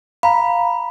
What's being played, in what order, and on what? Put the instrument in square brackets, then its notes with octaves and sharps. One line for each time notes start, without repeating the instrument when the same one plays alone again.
[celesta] F5 A#5 [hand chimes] B5